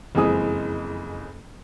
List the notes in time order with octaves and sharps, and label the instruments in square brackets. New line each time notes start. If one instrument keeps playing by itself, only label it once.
[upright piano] F#1 F2 E3 G#3 G#4 D#6